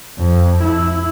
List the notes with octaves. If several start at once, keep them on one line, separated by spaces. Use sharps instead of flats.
F2
E4